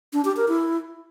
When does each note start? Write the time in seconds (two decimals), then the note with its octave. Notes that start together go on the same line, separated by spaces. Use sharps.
0.13 D4
0.25 G4
0.37 A#4
0.48 E4